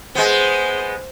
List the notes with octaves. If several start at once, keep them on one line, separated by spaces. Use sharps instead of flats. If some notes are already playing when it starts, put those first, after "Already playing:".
G#3 B3 C5